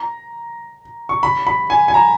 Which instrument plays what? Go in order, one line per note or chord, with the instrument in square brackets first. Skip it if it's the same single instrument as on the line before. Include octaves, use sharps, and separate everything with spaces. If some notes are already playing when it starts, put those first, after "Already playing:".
Already playing: [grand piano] A#5
C#6
B5
B5
G#5
G#5
A#5